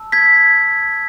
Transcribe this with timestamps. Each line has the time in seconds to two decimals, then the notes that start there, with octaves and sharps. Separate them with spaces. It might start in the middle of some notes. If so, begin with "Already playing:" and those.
Already playing: A5 E6
0.12 G#6 B6